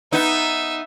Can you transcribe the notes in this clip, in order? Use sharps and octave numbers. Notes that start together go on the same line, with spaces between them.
B3 D#4 E5